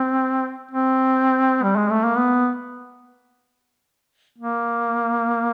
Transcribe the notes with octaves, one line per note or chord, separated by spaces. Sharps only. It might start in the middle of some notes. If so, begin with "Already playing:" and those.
Already playing: C4
C4
G3
G#3
A3
A#3
B3
A#3